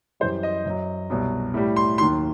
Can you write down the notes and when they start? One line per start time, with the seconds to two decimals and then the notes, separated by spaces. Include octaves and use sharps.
0.20 F#2 E3 G3 C5
0.43 D#5
0.65 F#2 F#3
1.10 C2 B2 F#3
1.54 A2 G3
1.76 C6
1.98 D#2 D#3 F#3 C6